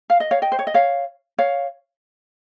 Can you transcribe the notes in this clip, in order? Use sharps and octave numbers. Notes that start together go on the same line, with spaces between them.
F5
D#5
C#5 F5
D#5 G5
C5
C#5
D#5
C#5 F5
C#5 F5